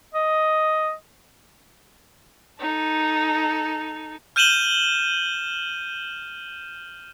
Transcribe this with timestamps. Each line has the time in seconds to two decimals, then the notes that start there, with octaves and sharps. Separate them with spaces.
0.14 D#5
2.60 D#4 A4
4.36 F6 G6 D#7 E7 F#7 G7